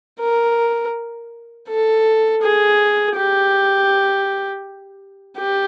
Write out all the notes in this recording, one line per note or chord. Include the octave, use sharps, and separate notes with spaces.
A#4
A4
G#4
G4
G4